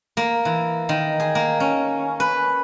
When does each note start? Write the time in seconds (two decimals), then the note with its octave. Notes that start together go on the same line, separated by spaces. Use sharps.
0.17 A#3
0.45 E3
0.89 D#3
1.20 G#4
1.35 A#3
1.60 C#4
2.20 B4